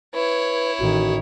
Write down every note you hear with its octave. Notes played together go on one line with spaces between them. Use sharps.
E4 B4 C#5
A1 D#3 F#4